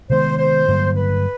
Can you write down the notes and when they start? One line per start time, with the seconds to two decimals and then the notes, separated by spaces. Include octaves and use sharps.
0.10 C3 D#3 G#3 B3 C5
0.38 C5
0.68 G2 D3 F#3 A#3
0.96 B4